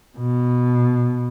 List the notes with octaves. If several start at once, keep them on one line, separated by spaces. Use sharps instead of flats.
B2